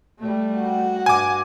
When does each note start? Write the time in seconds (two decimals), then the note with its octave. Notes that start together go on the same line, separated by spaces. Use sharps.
0.19 G3 A3
0.57 F#4 F#5
1.06 G2 G#5 D6